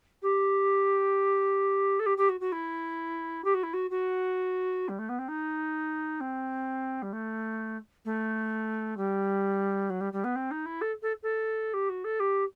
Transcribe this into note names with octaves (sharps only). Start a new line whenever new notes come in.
G4
A4
G4
G4
F#4
F#4
E4
G4
F#4
E4
F#4
F#4
G3
A3
B3
C4
D#4
C4
G3
A3
A3
G3
F#3
G3
G3
B3
C4
D#4
E4
A4
A4
A4
G4
F#4
A4
G4